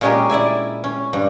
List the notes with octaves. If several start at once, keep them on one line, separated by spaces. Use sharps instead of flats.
A#2 G#3 C#4 G4 G#4 A#4
E4 D5 E5 G#5
C#4
G2